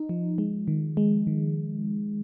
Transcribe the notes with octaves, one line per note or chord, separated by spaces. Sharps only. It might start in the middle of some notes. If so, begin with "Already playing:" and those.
Already playing: D#4
F3
G#3
D#3
G#3
D#3